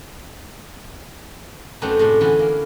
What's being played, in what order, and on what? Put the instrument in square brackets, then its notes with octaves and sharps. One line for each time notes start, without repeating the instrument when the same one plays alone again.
[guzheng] F#2 A3 B3 C4 D4 D#4
A2 C3 G#3 D4
D3 E3 B3 C#4 E4
A#3